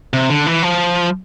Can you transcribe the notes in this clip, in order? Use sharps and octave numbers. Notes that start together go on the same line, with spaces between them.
C3
D3
E3
F3